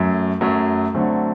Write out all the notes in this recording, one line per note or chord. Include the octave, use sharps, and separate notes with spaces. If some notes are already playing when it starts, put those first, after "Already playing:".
Already playing: F#2 F#3 A3
F#2 F#3 A3
D3 F#3 A3 C4